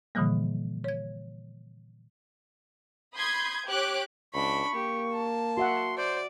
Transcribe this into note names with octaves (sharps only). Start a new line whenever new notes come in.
A#2 D3 E3 F3 G3 A#3
C#5 G#6
B5 C6 D#6 G6 G#6
G4 C#5 D6 F#6
C#2 D4 B5 C#6
A#3 G4
A5
F#4 E5 F#5 C6
C5 D5